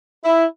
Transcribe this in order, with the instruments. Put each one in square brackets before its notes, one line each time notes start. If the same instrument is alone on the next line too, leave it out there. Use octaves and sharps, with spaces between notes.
[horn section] E4